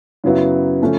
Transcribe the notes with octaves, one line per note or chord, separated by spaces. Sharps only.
F#2 C#3 F#3 B3 E4
C#3 F3 A3 C#4